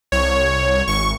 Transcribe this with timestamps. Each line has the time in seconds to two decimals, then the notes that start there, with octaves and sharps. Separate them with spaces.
0.12 C2 C#5
0.88 G#1 C#6